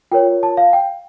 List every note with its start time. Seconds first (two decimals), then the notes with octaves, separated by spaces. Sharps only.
0.11 F4 A#4 C#5 G5
0.43 A5
0.57 F5
0.73 G5